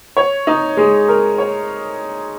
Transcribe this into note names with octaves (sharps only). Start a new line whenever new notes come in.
C#5
D#4
G#3
A#4
C#5